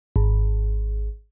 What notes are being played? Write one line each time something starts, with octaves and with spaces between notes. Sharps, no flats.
G#1